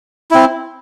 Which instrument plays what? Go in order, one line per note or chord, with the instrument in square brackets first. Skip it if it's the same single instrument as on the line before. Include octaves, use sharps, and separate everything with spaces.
[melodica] C4 E4